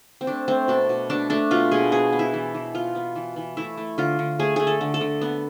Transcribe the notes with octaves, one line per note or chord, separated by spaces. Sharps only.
C4
A3 D4
A3 C4
B2 D4
B2
A3 D4
A3 D4
B2 F4
B2 G#4
B3 G#4
B3
E4
E3
E3
B3 F4
B3
E3
E3
A3 E4
A3
D3 F4
D3
A3 G#4
A3 G#4
A4
D3
A4
D3
B3